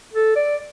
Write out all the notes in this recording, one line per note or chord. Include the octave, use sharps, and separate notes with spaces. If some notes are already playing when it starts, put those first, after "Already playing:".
A4
D5